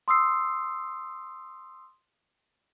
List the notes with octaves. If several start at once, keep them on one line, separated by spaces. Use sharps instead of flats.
C6 D#6 E6 C7